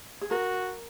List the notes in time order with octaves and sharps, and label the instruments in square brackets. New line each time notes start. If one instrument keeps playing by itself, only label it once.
[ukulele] G#4
[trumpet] F#4 [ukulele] A#4